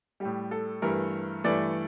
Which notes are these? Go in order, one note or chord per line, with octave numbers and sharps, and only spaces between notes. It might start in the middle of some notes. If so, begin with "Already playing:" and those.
A2 G3 G4
A4
G2 E3 A3 A#4
G2 E3 A3 D5